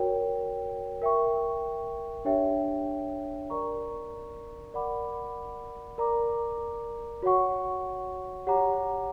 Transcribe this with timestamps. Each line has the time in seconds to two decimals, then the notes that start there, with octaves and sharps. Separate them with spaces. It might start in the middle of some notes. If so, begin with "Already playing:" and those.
Already playing: F#4 A#4 C#5 G5
1.02 A#4 E5 G5 C#6
2.25 D4 G4 C#5 E5 G5
3.50 A#4 D5 A#5 C#6
4.74 A#4 D5 F#5 B5 D6
5.98 A#4 D5 A#5 D6
7.22 F#4 C#5 F#5 C#6
8.47 G4 C#5 F#5 A#5 D6